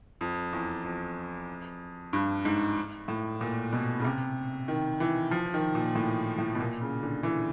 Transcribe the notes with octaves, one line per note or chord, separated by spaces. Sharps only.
F2
E2
F2
G2
G#2
A2
A#2
B2
C#3
C3
D#3
E3
F3
D#3
A#2
A2
A2
B2
A#2
C#3
D3
E3